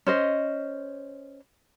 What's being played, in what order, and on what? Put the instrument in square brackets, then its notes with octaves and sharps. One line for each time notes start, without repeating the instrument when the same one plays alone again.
[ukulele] C#4 C5 D#5